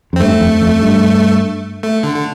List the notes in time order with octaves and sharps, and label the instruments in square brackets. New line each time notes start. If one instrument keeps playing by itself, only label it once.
[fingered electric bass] F2
[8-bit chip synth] C4
[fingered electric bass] G2 [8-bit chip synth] A3
[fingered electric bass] F2
F2
G2
[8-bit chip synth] A3
D3
D3